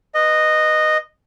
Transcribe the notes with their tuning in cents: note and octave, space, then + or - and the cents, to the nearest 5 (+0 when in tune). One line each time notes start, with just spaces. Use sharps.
B4 +0 D#5 -10